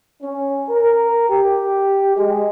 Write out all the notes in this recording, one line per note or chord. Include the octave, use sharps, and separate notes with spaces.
C#4
A#4
G4
G#3